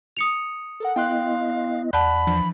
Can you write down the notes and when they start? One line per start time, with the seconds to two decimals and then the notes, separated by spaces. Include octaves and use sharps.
0.17 D#6 C#7 F7
0.80 A4 A#4 F#5
0.96 B3 E4 D#5 F5 G5 C6 F#6
1.93 E2 D5 F#5 A5 B5 F#6
2.27 E3 F3 D4